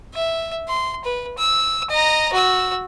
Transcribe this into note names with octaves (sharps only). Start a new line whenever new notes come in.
E5
C6
B4
E6
D#5 A#5
F#4 E6